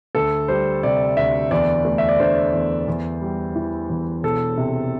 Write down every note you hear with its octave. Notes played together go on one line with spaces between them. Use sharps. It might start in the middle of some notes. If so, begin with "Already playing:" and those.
D2 A4
G3 C5
C3 D5
D2 E5
E2 D5
A3
E5
D5
D3 C5
E2
E2
G3
E3
E2
E1 A4
C3